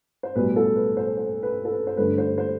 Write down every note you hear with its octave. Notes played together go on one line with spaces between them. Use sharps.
C5
B1 A2 G3 B4
A4
B4
C5
C5
B4
A4
B4
C5
G2 D3 A3 B4
C5
C5